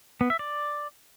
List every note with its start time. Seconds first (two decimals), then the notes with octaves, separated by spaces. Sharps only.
0.21 B3
0.30 E5
0.39 D5